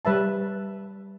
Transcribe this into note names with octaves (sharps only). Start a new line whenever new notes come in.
G3 B4 E5 A5